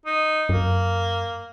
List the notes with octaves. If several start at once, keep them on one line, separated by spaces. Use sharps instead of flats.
D#4
F#2 A#3